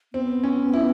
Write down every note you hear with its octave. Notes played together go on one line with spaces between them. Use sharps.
B3 C4
C#4
E4